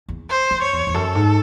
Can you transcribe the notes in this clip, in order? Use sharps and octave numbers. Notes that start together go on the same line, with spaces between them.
E2
C5
F#2
C#5
E2
E2
F#2 A4
G#2